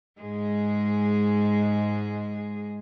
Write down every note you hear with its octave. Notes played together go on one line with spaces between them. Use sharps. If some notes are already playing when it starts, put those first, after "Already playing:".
G#2 G#3 G#4